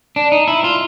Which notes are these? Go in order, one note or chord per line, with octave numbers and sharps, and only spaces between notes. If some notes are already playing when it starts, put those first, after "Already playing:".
D4
D#4
E4
F4